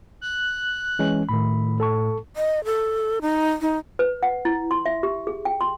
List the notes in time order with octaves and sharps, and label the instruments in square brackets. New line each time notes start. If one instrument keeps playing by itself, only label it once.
[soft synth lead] F#6
[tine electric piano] E3 G#3 C#4
[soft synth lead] A2 [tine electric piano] D#3 B5
[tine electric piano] A4 A5 C#6
[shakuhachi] D#5
A4
D#4
D#4
[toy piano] B4
F#5
E4
C6
E5
G4
G#4
G5
C6